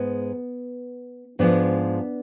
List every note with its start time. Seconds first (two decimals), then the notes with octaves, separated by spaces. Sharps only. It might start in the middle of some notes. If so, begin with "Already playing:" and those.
Already playing: G#2 G#3 B3
1.39 G#2 F3 G#3 B3 D4